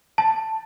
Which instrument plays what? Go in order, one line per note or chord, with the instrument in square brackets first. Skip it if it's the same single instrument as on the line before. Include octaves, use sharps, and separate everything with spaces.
[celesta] A5